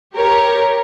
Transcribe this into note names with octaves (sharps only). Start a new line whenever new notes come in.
G4 A#4 C#5